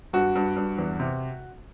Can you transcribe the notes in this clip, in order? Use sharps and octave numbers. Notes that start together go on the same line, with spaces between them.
G2 F#4
G2
G2
E2
C3